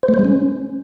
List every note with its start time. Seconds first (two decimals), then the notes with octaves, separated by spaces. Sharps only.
0.03 C5
0.08 A3
0.14 C5
0.19 G#3
0.25 C#4